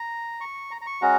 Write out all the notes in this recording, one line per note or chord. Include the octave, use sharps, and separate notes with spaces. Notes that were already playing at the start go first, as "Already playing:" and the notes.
Already playing: A#5
C#6
A#5
A#5
C#6
G#3 C#4 F#4 A#5